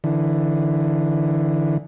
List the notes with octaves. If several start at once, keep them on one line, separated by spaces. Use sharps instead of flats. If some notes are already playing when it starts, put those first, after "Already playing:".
D3 E3